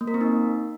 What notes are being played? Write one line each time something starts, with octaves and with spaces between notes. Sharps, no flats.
A#3
A#4
C4
D#4